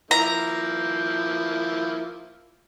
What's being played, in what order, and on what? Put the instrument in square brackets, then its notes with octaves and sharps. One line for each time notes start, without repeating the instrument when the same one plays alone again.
[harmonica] F3 A#3 E4 [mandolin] A#5